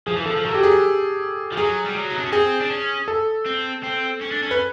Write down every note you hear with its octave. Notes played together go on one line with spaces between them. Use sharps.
F3 G#4
E3
F3 A4
F3
F#3 A4
G4
G#4
F3
F#3 G#4
G3
F#3
D#4
D4
C#4
C4 G#4
D4
C#4
A4
C4
C4
C#4
D4
C#4
B4